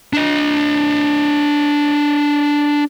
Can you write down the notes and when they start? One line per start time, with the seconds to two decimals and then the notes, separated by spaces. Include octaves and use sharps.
0.13 D4 D#5